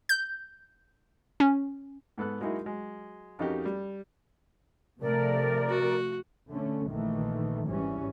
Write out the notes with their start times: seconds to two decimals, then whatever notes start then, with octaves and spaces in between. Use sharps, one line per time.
0.09 G6
1.40 C#4
2.18 G#2 B3 A4 F#6
2.40 F#3 G#3 A#3 D#4 E4 F#4
2.64 F#3 G#3
3.39 F2 C#4 D#4 F#4 G4 A#4
3.65 G3
5.01 C3 F3 A3 A#4 D5
5.69 F#4
6.50 D3 A3 C#4
6.88 A#1 D#3 E3 A3
7.66 G#1 E3 G3 C#4